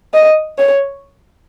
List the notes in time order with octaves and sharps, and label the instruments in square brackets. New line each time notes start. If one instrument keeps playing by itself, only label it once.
[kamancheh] D#5
C#5